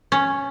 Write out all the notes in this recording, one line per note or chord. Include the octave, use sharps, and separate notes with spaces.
C#4